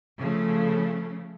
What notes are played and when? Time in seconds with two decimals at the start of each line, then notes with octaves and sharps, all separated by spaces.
0.18 C#3 F3 A3